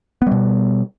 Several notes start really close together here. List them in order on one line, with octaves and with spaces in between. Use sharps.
B3 G3 B2